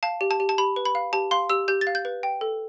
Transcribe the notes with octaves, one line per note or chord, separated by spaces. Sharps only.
F5 A5
G4
A5
G4
A5
G4 B5
B4
B5
F5
G4 A5
F5 C6
G4 E6
G4 G6
A6
F5
G6
B4
G5
A4